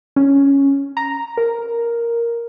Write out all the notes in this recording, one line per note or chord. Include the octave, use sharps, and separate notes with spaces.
C#4
A#5
A#4